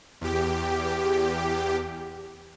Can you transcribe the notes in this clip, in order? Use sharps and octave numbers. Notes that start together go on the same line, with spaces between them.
E2 G4